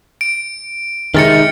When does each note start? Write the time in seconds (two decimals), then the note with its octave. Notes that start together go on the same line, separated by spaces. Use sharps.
0.21 D7
1.15 C3 D#3 G#3 D#4 F6 A6 C#7